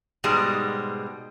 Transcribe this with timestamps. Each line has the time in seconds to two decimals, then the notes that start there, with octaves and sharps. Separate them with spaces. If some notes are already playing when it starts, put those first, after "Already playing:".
0.24 G#2 B2 G3 G#3